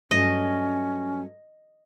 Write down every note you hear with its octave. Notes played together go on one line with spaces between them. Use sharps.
G2 F#3 A3 C#4 D#5